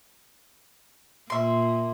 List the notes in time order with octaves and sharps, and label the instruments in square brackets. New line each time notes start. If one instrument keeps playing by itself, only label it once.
[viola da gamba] A#2 A#3 [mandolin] E5 C6